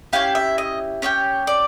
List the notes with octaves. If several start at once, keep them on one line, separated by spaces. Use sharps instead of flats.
C#4 E4 G4 F5
E5
D#5
C#4 E4 G4 C#5
D5